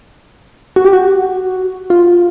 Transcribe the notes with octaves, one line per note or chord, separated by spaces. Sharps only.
F#4
G4
F#4
F4